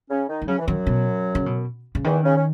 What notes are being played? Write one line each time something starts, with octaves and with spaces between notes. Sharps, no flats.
C#3 C#4
D#3 D#4
G#3
C#3 F#3 C#4
E3
F#2 D#3 F#3
B2
C#3
B2
C#3
E2 D#3 E3
C#3 C#4
C#4